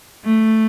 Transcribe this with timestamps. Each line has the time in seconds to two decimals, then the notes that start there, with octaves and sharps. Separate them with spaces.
0.24 A3